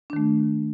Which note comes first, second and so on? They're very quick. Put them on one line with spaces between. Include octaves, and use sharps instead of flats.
D4 D#3 A3